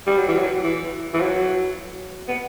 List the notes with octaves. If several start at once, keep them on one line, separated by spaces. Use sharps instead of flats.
G3
F#3
E3
F#3
E3
E3
F#3
B3